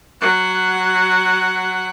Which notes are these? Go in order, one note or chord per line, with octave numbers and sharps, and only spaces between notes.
F#3 F#5